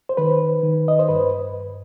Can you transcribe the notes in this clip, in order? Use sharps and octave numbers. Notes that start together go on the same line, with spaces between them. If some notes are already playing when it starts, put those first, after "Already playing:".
C5
D#3 B4
D#3
D#5
C5
G2 B4